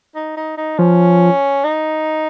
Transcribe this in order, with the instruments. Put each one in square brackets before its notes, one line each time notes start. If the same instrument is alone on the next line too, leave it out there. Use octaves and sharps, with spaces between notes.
[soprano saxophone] D#4
D#4
D#4
[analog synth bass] F3 [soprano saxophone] C#4
[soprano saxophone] D#4